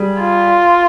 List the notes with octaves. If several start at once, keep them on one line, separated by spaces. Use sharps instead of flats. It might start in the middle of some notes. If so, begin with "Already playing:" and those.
Already playing: G3 G#4
F4